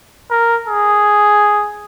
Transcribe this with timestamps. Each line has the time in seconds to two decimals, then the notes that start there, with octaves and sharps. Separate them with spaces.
0.31 A#4
0.67 G#4